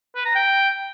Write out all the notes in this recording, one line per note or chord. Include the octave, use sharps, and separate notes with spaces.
B4
A#5
G5